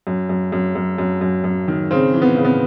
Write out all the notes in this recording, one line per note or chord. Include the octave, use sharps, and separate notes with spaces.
F#2
F#2
F#2
F#2
F#2
F#2
F#2
D#3
C#3 C4
E3
B3
C#3
B3